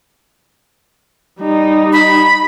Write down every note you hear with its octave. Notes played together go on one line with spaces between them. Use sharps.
G3 D#4
B5